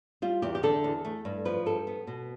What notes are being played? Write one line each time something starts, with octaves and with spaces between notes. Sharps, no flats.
G3 F4
E2 G4
G4
D3 A4
E2
A3
G2
F3 B4
G2 A4
B3
B2